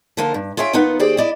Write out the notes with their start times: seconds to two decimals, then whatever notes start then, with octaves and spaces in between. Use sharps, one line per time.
0.17 D3 F3 A#3 F4 A4
0.34 G2
0.57 F4 G#4 C#5 E5 G5
0.73 D#2 B3 D#4 F4 B4 F#5
0.99 D#2 G4 G#4 C5 D5 G5
1.17 E4 D5 D#5